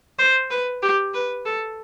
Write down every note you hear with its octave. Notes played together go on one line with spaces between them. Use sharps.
C5
B4
G4
B4
A4